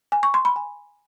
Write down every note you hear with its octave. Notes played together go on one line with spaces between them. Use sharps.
G#5
C#6
C6
B5
G#5